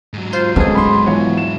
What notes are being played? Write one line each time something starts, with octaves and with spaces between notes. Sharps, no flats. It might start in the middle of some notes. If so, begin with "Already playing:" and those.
G#2 F#3
F4 C5 C6
C#3 G#3 A3 B3 G#4
B5 C6
E3 F3 B3 C#5
E7